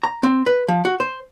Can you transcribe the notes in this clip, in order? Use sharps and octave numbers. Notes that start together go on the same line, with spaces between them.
A#5
C4
B4
F3
F#4
C5